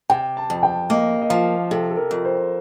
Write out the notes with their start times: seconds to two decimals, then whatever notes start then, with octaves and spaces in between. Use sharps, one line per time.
0.10 C3 G5
0.37 A5
0.50 F2
0.63 G5
0.90 A#3 D#5
1.22 D#5
1.30 F3 F5
1.71 C3 A4
1.91 A4
1.97 A#4
2.11 F2
2.25 C5